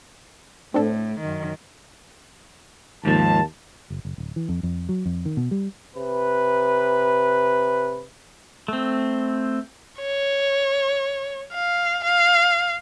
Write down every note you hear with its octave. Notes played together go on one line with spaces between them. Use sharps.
A2 C4 D4 A4
F#2 D#3
D#2 G#2 F3 A5
F#1
F#1
D1
E3
F2
F2
F#3
F2
D#3
B2
G3
C3 B4
A3 C4
C#5
F5
F5